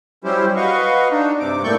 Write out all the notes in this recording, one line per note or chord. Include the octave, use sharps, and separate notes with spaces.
F#3 G3 C#4 E4 G4 C5
F#4 B4 D#5 F5 C#6
D4 D#4
G2 C3 C4 D6
A2 A3 A#3 D5 C#6 G6